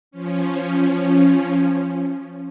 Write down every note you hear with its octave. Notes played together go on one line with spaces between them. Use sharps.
F3 C#4